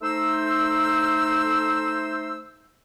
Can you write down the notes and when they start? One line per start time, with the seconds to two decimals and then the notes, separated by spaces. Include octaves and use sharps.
0.02 A3 D#4 C5 E6